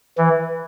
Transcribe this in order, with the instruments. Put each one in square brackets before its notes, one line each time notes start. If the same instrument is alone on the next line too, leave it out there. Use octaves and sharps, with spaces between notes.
[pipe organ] E3